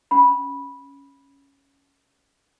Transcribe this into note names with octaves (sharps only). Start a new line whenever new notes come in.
C#4 B5